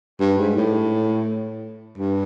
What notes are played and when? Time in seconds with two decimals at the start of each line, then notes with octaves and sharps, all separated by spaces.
0.20 G2
0.38 G#2
0.56 A2
1.98 G2